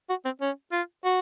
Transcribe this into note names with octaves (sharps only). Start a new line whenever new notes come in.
F#4
C4
C#4
F4
F#4